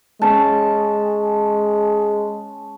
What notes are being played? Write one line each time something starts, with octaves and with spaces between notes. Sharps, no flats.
G#3 C#4 A5